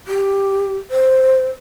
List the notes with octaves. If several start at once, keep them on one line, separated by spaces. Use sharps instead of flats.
G4
C5